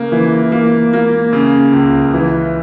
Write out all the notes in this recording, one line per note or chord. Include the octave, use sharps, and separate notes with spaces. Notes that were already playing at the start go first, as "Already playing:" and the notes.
Already playing: C#3 A#3
E3
A#3
A#3
C#3
C#2
E3